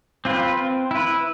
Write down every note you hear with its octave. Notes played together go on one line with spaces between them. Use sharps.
C4 F4 B4
C4
E4 B4